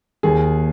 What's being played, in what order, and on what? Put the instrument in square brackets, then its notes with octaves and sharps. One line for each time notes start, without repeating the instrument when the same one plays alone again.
[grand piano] D#2 D#3 G#4